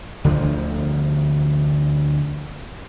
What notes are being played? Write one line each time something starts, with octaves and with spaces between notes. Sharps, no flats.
D2 D3 F3